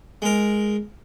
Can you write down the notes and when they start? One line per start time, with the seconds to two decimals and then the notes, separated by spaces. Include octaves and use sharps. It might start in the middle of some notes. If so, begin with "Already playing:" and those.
0.22 G#3 A#4